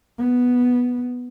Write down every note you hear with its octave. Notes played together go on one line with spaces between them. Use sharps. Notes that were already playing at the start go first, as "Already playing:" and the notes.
B3